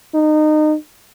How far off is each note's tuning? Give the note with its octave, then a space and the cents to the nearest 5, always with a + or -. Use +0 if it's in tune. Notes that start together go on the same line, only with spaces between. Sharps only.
D#4 -25